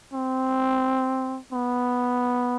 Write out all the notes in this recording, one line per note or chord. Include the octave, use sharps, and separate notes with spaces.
C4
B3